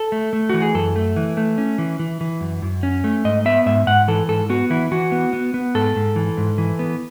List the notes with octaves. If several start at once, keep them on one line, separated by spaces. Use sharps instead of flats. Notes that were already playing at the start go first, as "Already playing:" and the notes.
Already playing: A4
A3
A3
E3 F#4
G#4
F#2 A4
A3
E3
A3
C#4
E3
E3
E3
F#2
F#2
C#4
A3
G#2 D#5
B3 E5
G#2 E5
G#2 F#5
E3 A4
G#2 A4
B3 F#4
E3 E4
E3 F#4
B3
B3
B3
G#2 A4
G#2
E3
G#2
E3
B3